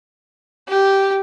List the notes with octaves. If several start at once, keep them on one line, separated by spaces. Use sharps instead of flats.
G4